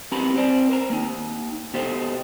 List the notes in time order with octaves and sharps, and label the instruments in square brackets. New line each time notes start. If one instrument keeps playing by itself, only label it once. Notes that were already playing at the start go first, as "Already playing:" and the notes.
[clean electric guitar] B3 C4 G4 A#4 A#5 B5
C4 C5 D5
A#4 C5 A#5
A#3 D#4
B2 G4 A4 C5 D#5